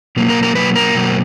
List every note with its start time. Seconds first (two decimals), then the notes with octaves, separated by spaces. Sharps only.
0.16 B2 F#3 A#3
0.30 A#4
0.43 A#4
0.55 B2 F#3 A#3 B4
0.76 A#4
0.94 B2 F#3 A#3